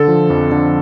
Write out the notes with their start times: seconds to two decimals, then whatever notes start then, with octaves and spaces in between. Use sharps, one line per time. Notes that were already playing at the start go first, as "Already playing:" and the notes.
Already playing: D3 A4
0.08 F3
0.30 F2
0.52 D3